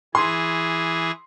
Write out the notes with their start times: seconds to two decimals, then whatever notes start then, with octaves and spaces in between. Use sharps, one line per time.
0.15 E3 G#4 C6